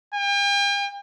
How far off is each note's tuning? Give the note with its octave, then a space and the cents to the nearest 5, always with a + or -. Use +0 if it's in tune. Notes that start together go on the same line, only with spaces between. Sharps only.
G5 +45